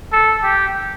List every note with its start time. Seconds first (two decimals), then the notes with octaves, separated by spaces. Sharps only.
0.12 A4
0.44 G4